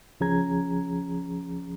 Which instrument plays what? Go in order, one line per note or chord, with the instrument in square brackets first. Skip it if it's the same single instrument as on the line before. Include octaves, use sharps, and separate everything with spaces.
[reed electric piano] C#2 F3 C#4 G#4 A#5 G#6